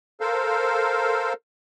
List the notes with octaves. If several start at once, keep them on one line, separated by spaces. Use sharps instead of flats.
A4 A#4 C5 F5